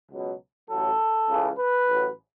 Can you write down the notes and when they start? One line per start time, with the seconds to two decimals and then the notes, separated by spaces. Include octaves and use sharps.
0.11 C#2 B2 F#3
0.69 A1 A2 F#3 A4
1.29 C#2 C#3 E3
1.57 B4
1.88 A1 A2 F#3